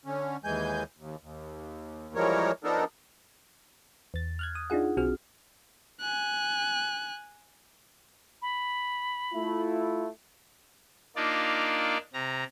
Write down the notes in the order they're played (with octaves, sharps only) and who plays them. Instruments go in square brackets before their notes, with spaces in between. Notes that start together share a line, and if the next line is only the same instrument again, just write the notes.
[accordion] D3 C#4
D#2 E3 G#3 G#5 G6
D#2
D#2
E3 F3 G3 G#3 A#4 C#5
F3 B3 D4 D#4 A4 A#4
[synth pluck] E2 A6
F6 F#6 G#6
D#6
D4 D#4 F4 G#4 F#5
B1 C4 F#4 G#4 F6
[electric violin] G#5 F#6
[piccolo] B5
[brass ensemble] A3 E4 F4
[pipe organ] A#3 D4 D#4 F4 D5
C3 A#5